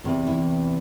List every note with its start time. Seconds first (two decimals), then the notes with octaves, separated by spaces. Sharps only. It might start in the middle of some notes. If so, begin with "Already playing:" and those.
0.04 E2 C3 E3
0.27 E4